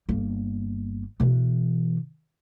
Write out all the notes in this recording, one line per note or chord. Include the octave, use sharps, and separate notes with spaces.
G1 A#3
B2 E3